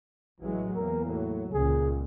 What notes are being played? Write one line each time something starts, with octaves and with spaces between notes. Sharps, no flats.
A1 E3 F#3 G#3
E2 A#3 A#4
A2 F#3
C#2 A#2 G#4